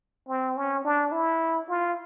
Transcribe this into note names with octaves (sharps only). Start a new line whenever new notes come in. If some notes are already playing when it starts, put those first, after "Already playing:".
C4
C#4
D4
E4
F4